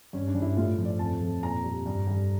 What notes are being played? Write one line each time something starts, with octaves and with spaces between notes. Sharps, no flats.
G2 C#4
D4
G2
E4
A2 F4
F3
D5
F2 A5
F2
A#2 A#5
G3
G2
G2